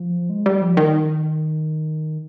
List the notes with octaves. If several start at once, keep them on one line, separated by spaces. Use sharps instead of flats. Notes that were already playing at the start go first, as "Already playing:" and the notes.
Already playing: F3
G#3
G3
F3
D#3